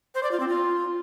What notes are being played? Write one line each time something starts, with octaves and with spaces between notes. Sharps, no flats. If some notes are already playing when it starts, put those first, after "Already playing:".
C5
D5
F4
C4
F4